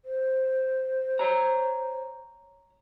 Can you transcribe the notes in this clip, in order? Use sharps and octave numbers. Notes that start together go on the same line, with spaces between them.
C5
C#5 A#5